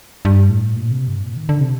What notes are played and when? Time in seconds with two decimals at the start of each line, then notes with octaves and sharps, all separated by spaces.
0.25 G2
0.50 A2
0.74 A#2
0.91 C3
1.08 G2
1.23 A#2
1.36 D#3
1.49 D3
1.60 C3